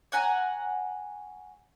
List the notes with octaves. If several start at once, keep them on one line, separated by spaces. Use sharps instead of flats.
C#5 F#5 G#5 A#5